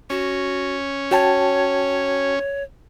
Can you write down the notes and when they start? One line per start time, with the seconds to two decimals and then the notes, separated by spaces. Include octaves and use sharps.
0.10 C#4 F#4
1.11 F#4 C#5 G5 A5